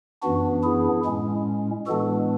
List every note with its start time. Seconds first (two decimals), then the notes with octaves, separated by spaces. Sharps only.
0.23 F#2 E3 B3 D4 F#4
0.63 E4 G#4
1.05 A2 G#3 C#4
1.87 A2 E3 G#3 B3 D4 F#4 A4